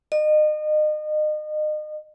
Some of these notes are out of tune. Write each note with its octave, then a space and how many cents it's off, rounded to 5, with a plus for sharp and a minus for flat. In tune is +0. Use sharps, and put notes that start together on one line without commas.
D#5 -35